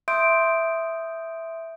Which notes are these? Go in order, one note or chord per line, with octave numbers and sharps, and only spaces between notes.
E5 C6 D#6 G6 D7